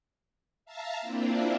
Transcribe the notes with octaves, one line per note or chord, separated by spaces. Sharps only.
E5 F5 A5 A#5
A#3 C4 D4 E4 F4